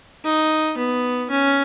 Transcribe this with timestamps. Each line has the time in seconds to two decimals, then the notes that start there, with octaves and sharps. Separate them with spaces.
0.25 D#4
0.77 B3
1.30 C#4